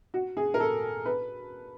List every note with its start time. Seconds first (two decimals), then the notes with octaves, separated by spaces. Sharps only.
0.14 F#4
0.37 G#4
0.54 A#4
0.60 A4
1.06 B4